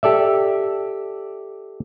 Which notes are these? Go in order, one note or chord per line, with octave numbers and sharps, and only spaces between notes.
G4 A4 D5 E5